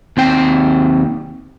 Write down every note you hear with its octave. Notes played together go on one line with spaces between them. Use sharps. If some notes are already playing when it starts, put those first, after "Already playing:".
D#2 C4 G5